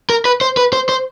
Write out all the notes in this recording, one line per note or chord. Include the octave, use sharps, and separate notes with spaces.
A#4
B4
C5
B4
C5
C5